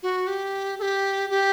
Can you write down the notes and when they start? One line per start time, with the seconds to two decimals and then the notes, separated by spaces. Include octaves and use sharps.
0.03 F#4
0.27 G4
0.79 A4
0.82 G4
1.30 G4